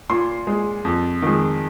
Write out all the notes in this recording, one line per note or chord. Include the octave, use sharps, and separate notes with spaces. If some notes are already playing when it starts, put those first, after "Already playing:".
A#2 C6
G#3
F2
D#3 G#3